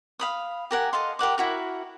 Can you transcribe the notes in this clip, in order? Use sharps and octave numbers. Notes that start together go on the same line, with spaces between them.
F5 B5 D#6
G4 A#4 F#5 G#5
A4 D#5 F5 C6
G4 A#4 F#5 D6
E4 F#4 A#4